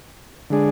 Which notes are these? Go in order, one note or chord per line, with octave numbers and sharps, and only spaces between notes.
D3 G#3 D4 G#4